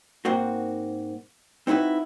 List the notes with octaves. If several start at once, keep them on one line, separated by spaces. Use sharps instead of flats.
G#2 A#3 C4 F#4
C4 D#4 E4 F#4 B4